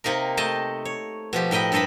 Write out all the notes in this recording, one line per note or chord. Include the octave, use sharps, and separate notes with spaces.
C3 A#3 D#4 A#4
A3 D#5 G5 A5
C#5
B2 F3 G4
A2 A#4 D#5 G5 B5
G2 A4 A#4 D#5 A5 B5